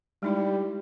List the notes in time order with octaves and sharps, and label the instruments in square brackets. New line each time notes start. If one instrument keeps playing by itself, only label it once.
[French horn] G3 [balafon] G#3 D#4 E4